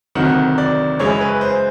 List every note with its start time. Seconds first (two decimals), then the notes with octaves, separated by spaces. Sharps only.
0.15 D2 C3 D#3 F#3 F#5
0.58 D5
0.99 F#2 C#3 E3 G#3 C#5
1.21 B4
1.41 C5